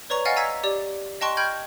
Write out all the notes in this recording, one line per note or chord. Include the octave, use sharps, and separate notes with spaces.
B4 C#5 D5 A#5 C#6 F7
D#5 F5 F#5 G#5 F6 A6
G#5 A#5 E6 G#6 B6
G4 D5
D#5 G5 A5 C6 C#6 F#6
G5 B5 F6 G6 G#6